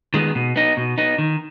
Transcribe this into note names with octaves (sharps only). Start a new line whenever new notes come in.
D#3 G#3 B3
B2
B3 D#4
B2
B3 D#4
D#3